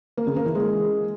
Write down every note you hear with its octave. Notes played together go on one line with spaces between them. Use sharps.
A#3
C#3
A#3
E3
G#3